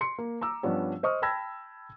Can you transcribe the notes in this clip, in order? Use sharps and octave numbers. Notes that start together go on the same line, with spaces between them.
C6 C#7
A#3
A#5 D6 E6
G2 F3 G3 B3 C#4 D4
C5 D#5 C#6 D#6 F6
G5 A5 B5 E6 G#6 A#6